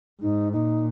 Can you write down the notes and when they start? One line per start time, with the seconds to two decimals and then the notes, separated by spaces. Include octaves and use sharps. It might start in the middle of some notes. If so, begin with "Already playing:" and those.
0.21 G#2 D#4
0.53 A#2 D#4